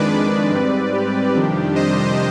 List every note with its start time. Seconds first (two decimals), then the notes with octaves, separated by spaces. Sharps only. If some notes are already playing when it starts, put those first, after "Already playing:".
Already playing: F2 D#3 G#3 D4 B4 D5
0.51 G#2 G3 C4
0.93 G4
1.34 F2 C3 D#3 G3 D4
1.76 C5 D#5